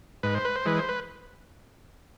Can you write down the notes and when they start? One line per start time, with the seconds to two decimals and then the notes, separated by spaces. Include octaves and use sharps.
0.23 G#2 B4
0.35 C5
0.45 B4
0.56 C5
0.65 E3 G#3 B4
0.79 C5
0.89 B4